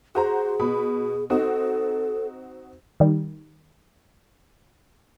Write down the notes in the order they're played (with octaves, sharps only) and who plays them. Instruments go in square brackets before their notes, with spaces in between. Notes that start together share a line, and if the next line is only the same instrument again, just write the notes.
[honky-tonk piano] F#4 C5 A#5 [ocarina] G#4
[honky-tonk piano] B2 B5
[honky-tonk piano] C4 D#4 F#4 [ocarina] A4
[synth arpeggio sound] D#3 G3